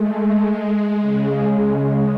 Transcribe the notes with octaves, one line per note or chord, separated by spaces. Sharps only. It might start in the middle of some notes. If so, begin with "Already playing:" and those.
Already playing: G#3 A3
G#3
C#3